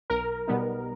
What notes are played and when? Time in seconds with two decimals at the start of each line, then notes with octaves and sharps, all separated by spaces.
0.10 B1 A#4
0.47 B2 G3 B3 D#4